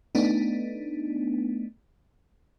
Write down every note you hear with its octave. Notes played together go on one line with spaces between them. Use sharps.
A3 B3 D4 D#4